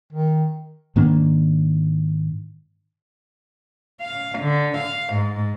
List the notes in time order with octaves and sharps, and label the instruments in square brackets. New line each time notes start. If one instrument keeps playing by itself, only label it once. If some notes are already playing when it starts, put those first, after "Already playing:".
[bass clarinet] D#3
[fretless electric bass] G#2 D#3 A#3 D4
[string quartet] F5
D3
F5
G#2